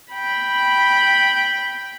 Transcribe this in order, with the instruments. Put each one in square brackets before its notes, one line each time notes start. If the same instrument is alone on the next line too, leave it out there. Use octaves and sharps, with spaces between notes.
[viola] G5 B5